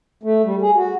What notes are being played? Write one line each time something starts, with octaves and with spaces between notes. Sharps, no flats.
A3
G3
G#4
F#4